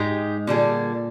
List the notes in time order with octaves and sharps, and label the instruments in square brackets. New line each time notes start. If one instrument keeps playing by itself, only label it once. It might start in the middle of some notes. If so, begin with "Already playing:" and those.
Already playing: [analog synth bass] G#2 [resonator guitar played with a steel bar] G#3 D#4 G4
[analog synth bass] A#2 [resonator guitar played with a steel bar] D3 G3 D4 G#4